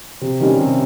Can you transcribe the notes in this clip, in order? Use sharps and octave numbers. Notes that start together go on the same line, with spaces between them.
C3
D#3 G3 C#4
C3